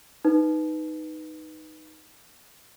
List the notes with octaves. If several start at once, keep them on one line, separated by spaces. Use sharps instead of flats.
D#4 B4